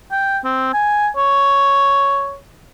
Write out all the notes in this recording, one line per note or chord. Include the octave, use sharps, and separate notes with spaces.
G5
C4
G#5
C#5